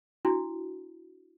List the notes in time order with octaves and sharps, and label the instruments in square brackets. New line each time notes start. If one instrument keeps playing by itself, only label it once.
[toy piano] D4 E4 F#4